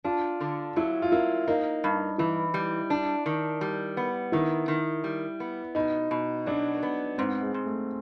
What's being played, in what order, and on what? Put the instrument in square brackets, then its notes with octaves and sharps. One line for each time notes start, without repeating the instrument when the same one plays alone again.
[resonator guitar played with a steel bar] D4 [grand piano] F4
[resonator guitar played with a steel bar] D3
[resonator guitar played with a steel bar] F#3 [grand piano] E4
[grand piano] F4
[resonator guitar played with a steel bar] A#3 [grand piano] E4
[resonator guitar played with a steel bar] A#3 [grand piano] D#4
[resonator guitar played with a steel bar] G2
[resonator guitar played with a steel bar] E3 [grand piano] E4
[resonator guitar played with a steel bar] G3
D4
D#3
G3
B3
[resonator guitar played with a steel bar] D#3 [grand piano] E4
[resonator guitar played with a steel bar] D#3
G3
B3
[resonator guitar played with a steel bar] B2 [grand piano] D#4
[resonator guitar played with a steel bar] B2
[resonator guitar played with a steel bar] F#3 [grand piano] D4
[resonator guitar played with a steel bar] B3
[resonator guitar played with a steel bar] G#2 [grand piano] C4
[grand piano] G#3
[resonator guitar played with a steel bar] G#2
[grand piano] A3